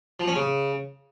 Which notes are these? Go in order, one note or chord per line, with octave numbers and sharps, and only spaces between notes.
F3
C#4
C#3